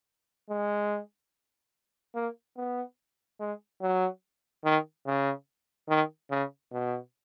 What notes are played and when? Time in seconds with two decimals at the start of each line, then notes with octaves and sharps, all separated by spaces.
0.50 G#3
2.15 A#3
2.57 B3
3.40 G#3
3.81 F#3
4.64 D#3
5.06 C#3
5.89 D#3
6.30 C#3
6.72 B2